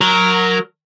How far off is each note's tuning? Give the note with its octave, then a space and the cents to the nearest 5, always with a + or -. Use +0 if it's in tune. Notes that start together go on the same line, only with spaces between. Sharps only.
F#3 -10 A#4 +0